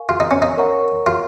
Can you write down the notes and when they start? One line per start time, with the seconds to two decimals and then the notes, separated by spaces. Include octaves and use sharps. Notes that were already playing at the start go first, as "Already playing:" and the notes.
Already playing: A#4 F5 G#5 C#6
0.09 F4
0.20 D#4
0.31 C#4
0.42 D#4
0.57 A#4 C#5 F#5 A#5 C#6
1.06 F4